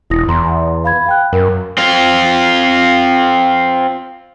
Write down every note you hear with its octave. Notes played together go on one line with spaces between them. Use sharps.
E1 E4 D#6 A#6
E2 A#5 C6
F5 B5 G#6
F5 G5 F#6
F#2 A#4
C4 F4